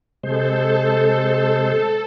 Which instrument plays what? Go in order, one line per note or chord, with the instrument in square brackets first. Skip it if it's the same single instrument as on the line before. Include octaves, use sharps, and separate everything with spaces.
[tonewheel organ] C3 G#3 C5 [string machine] A4